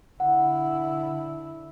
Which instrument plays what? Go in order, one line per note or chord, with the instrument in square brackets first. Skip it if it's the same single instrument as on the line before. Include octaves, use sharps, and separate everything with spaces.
[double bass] D3 E4 [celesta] F#5